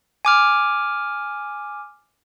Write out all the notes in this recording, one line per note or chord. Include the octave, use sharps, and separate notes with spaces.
G#5 D6 F6